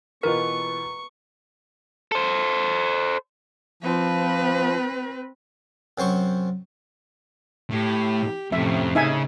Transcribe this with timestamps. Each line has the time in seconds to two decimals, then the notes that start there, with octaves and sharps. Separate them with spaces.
0.23 B2 E3 F4 A#4 B4 A#5 C#6
2.12 A4 C5
3.83 F3 C4 B4
5.98 F#2 C3 C5 C#6
7.71 A2 G4
8.52 F2 A2 C3 C#4 E5
8.95 C#3 D#4 E5 G#5